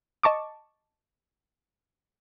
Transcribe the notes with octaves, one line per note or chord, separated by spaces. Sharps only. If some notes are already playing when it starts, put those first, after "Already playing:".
D#5 A5 C#6 D6